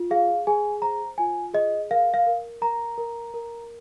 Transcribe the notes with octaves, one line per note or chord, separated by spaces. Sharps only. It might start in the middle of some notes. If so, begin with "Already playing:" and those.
Already playing: F4
G#4 F5
G#4 G#5
C5 A#5
F4 G#5
G#4 D#5
A#4 F5
F5
A#4
A#4 A#5
A#4
A#4